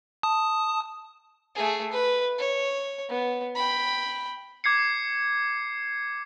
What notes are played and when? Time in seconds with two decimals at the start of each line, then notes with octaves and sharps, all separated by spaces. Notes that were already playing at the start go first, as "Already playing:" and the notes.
0.23 A5 D#6
1.55 A3 G#4
1.92 B4
2.38 C#5
3.09 B3
3.55 G5 B5
4.64 D6 G#6 C7 C#7